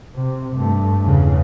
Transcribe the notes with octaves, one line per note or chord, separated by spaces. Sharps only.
C3
G2 A3
E2 C#3